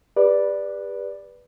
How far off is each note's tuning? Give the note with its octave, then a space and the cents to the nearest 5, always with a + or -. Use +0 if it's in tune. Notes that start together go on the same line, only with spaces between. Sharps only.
G4 +40 B4 -10 D5 +0